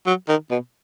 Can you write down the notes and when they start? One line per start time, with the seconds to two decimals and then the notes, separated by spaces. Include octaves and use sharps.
0.07 F#3
0.28 D#3
0.51 B2